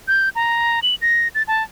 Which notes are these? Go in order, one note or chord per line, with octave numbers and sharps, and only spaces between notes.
G6
A#5
F#7
A#6
A6
A5